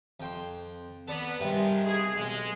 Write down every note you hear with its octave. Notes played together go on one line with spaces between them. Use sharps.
F2 G5 C6
B3 A4 D5 A#5
G2 C3 D#3 G3 G#3
B2 G#4
B1 G#3